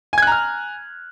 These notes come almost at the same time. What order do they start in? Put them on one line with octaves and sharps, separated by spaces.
G#5 G#6 F#6 A#5 F6